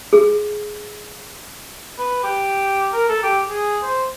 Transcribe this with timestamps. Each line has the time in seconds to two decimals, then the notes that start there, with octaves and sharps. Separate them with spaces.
0.13 G#4
1.99 B4
2.23 G4
2.93 A#4
3.09 A4
3.23 G4
3.48 G#4
3.83 C5